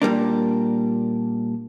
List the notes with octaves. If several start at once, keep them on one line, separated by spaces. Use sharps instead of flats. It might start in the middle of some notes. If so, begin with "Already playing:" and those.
A#2 G3 A#3 D4